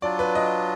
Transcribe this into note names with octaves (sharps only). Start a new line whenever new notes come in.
F#3 D4 F4 D5
B4
D#5